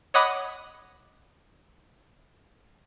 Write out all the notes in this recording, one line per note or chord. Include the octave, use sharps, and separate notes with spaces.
C#5 D#5 F#5 B5 D6 D#6